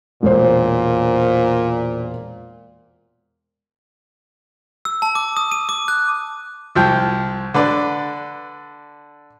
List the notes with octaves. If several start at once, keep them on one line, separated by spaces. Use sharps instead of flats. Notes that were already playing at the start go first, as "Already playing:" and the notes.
E1 A#2 C5
E6
A5
D6
D#6
D#7
D6
F#6
C2 F3 G5
D3 B4 D5